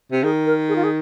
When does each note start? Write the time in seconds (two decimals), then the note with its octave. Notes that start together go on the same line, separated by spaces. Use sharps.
0.12 C3
0.23 D#3 G#4
0.46 A#4
0.69 G#4
0.76 F4
0.84 G#4